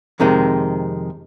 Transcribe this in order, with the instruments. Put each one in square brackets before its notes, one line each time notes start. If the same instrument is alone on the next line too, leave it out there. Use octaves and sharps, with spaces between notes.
[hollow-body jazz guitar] F2 C3 D#3 G#3